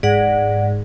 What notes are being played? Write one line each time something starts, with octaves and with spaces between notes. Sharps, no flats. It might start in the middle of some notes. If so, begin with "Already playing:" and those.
G#2 D5 F#5